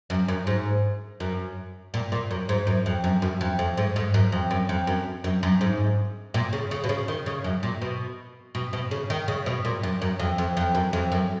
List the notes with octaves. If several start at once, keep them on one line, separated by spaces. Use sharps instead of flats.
F#2
F#2
G#2
F#2
A#2
A#2
F#2
G#2
F#2
F2
F#2
F#2
F2
F2
G#2
G#2
F#2
F2
F#2
F2
F#2
F#2
F#2
G#2
A#2
C#3
C#3
B2
C#3
D#3
C#3
F#2
A#2
B2
B2
B2
C#3
D#3
C#3
B2
A#2
F#2
F#2
F2
F2
F2
F#2
F2
F#2